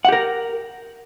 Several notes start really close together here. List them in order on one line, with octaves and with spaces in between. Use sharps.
F#5 G4 A#4